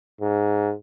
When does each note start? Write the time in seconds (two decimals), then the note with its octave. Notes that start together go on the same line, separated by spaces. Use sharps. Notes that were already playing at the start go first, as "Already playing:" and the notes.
0.21 G#2